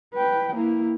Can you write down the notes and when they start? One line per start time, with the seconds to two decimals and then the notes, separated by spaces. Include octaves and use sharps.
0.15 B4 G5
0.55 A#3 E4